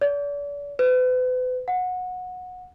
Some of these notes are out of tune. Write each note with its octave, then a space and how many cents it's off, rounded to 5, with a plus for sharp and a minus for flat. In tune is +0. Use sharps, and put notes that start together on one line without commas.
D5 -40
B4 +40
F#5 -20